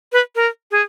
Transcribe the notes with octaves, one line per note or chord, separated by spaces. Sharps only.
B4
A#4
G#4